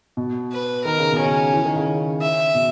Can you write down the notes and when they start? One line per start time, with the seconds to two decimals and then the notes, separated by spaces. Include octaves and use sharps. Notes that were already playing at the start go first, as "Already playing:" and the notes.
0.17 B2
0.52 B4
0.85 D#3 A#4
0.99 C#3
1.13 B2
1.19 C#4
1.25 C#3
1.54 E3
1.65 D#3
1.76 C#3
2.22 E5
2.55 B2